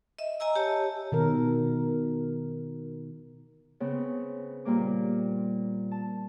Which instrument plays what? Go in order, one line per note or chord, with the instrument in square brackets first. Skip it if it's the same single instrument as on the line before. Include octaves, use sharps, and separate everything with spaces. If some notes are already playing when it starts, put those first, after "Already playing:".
[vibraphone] D#5 E5
D#5 G#5 A#5 E6
G4 C#5 A5
[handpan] B2 D#3 A#4
[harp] C#3 B3 C4
A#2 G3 A#3 D6
A5